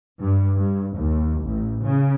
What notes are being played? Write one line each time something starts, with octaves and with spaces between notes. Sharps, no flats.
G2
G2
D#2
A1
C#3